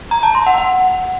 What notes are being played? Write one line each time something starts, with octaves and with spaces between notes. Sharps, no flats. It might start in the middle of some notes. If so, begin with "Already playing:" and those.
A#5
A5
C6
F#5
F#5